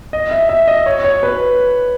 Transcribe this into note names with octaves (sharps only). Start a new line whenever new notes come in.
D#5
E5
E5
D#5
C#5
C#5
B4